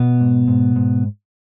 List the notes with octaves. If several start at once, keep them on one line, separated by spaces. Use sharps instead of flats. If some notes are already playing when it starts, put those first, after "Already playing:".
Already playing: B2 B3
G#2
G#2
G#2